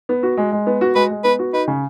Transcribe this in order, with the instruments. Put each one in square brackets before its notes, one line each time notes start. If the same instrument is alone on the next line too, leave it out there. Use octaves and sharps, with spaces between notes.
[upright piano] B3
F#4
G#3
G#3
B3
F#4
[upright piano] G#3 [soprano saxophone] B4
[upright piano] G#3
[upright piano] B3 [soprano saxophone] B4
[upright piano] F#4
[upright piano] D#4 [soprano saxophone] B4
[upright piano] C#3